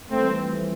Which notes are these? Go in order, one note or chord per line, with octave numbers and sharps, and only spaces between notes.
F2 E3 G3 A3 C4